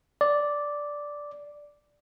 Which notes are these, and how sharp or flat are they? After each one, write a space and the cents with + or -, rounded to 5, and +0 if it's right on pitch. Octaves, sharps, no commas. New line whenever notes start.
D5 -5